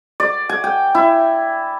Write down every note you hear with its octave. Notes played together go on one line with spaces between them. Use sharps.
D5
G#5
G5
E4